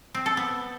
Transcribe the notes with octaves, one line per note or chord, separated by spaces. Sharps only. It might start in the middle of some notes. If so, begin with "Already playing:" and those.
C4
A4
B3